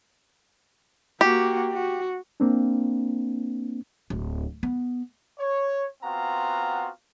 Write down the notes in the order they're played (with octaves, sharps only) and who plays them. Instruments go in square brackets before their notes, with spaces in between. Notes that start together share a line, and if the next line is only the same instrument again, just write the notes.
[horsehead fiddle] A#3 F#4 [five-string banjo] G4
[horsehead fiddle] F#4
[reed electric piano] A#3 C4 D4
[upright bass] D1
B3
[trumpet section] C#5
B3 C4 F4 F#4 F5 A#5